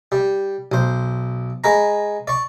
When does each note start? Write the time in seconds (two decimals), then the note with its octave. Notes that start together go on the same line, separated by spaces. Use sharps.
0.12 G3
0.72 B1 C5
1.64 G#3 B4 A#5
2.27 D5 C#6